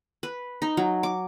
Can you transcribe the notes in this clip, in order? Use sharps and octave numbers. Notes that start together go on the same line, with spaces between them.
B4
D#4
F#3
D6